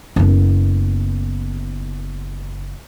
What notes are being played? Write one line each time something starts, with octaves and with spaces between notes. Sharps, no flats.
F#1 B3